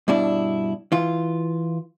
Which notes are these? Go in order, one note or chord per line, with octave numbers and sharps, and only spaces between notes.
G2 B2 D4 E4
E3 F4